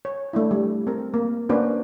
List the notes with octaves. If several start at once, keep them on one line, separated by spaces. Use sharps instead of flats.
C#5
A3 D4 E4
G3
C4 A#4
A#3
A#3 C#4 D4 F#4 B4 C5